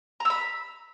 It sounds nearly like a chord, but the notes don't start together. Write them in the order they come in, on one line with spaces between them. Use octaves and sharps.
A#5 E6 B5